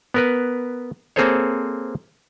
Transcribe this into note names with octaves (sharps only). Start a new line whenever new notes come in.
B3 A#4 B4
A#3 C4 G#4 A4 C5 C#5